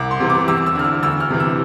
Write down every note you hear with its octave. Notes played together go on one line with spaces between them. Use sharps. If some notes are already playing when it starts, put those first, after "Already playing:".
Already playing: C2 D6
C6
C3 E3
D6
E2 E6
E6
D3 F6
E6
D2 E6
F6
C3 E3
E6